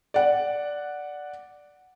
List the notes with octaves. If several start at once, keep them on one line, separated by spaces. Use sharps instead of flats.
D5 F#5